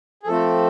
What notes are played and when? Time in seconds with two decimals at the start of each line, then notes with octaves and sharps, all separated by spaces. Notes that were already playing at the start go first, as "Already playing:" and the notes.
0.23 G#4
0.27 F3 A3 C4 A4